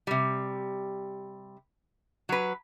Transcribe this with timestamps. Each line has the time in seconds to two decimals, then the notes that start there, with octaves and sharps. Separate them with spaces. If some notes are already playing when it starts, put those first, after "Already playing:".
0.07 C3 G3
2.29 F#3 B4